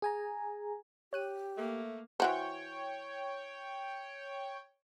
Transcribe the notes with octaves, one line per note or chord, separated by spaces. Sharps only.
G#4 G#5 A#5
G4 C#5 F#6 D#7
A3 A#3
E3 F#4 C5 C#5 G5